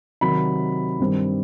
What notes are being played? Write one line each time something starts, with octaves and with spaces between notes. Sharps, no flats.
C3 D#3 F#3 B5
G2 D#3 G3 C4